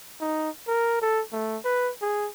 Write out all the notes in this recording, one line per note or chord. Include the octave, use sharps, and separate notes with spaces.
D#4
A#4
A4
A3
B4
G#4